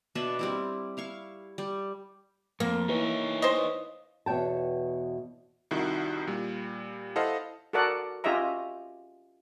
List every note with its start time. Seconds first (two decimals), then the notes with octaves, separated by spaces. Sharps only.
0.15 B2 D4 B4 E5
0.39 G3 C4 E4
0.97 E4 F5 C#6
1.58 G3
2.60 F2 A#3
2.88 E3 D#4 C#5
3.42 C5 D#5
4.26 E2 B2 C#5 G5 A5
5.71 C2 D#3 E4 F#4
6.27 A#2 G3
7.16 E4 A4 C5 D#5 F5 F#5
7.73 F#4 A4 A#4 D5 F#5
8.24 C#4 F4 G4 D#5 E5 A#5